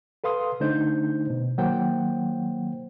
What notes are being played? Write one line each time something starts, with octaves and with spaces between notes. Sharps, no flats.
A4 B4 F5 C6 D#6
D3 A3 D4 D#4 C5 G6
B2
D#3 F#3 A#3 C5 F#5 G5